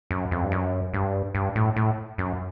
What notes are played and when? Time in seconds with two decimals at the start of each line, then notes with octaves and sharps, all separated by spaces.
0.11 F#2
0.31 F2
0.44 G2
0.52 F#2
0.94 G2
1.35 G2
1.56 A2
1.76 A2
2.18 F#2